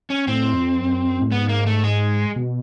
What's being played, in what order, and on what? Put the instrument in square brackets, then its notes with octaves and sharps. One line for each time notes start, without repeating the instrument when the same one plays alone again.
[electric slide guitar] C#4
[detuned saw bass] A2 [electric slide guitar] C4
[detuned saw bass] F2
F#2
A2
[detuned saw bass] G#2 [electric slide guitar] B3
[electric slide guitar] A#3
A3
G#3
[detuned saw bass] B2